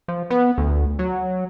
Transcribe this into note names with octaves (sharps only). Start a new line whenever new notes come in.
F3
B3
D2
F#3